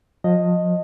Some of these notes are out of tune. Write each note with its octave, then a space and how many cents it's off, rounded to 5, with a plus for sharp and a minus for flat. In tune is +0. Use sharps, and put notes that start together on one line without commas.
F3 +30 D#5 +0